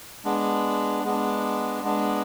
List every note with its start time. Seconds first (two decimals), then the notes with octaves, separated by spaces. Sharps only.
0.24 G#3 B3 D4
1.04 G#3 B3 D4
1.83 G#3 B3 D4